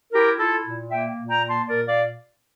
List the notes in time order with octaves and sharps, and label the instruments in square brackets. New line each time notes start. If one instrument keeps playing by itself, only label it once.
[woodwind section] E4 G4 A#4
E4 F4 A4
A#2
A#3 E5 G5
A#2
G5 A#5
A#3
A5 C6
A#2 A#4 D5
D5 F5